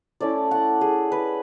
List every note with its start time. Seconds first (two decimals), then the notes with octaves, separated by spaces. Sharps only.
0.20 A3 C#4 E4 D5
0.51 F#5
0.81 G#4
1.12 B4